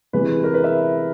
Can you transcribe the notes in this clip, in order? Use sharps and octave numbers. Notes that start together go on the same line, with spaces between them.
C3 E3 G#3 B4
A#4
B4
E5